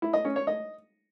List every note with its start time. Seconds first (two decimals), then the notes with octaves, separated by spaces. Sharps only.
0.02 E4
0.13 D#5
0.25 C#4
0.36 C#5
0.47 D#5